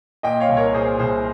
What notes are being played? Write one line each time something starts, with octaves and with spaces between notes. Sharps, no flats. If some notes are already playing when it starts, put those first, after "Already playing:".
A#2 D#5 G5
C#5 F5
C2
A#4 C#5
A#2 G#4 C5
C2 G#4 C5